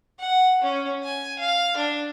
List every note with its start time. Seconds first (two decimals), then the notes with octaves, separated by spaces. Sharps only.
0.20 F#5
0.62 C#4
1.04 G#5
1.39 F5
1.77 D4